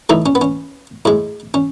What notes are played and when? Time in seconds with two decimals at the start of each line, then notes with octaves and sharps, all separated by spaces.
0.09 A2 E3 A3 D#4
0.26 C#4
0.35 B3
0.41 C#4
1.05 A2 G#3
1.54 C#4